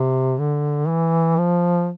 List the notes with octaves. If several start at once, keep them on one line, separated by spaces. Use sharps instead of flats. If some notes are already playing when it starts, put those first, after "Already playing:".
Already playing: C3
D3
E3
F3